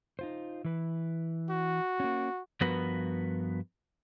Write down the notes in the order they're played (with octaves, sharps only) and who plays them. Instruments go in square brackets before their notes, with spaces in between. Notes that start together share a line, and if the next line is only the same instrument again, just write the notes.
[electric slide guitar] D#4 F4 C5
E3 B4
[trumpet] F#4
[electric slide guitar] A#3 C#4
G2 F3 B3 F#4 A#4 B4